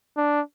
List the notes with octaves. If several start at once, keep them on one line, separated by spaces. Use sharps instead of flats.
D4